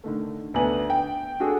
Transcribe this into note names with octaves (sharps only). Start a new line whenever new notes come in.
D3 D#3 A3
D2 B3 D4 B4 G#5 F#7
G5
D4 F#4 G#4 A4